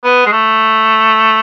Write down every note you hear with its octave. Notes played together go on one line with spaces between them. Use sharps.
B3
G#3
A3